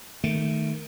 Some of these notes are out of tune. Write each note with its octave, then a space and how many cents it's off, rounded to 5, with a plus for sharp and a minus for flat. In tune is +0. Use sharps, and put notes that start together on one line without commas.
D#3 +0 A3 +0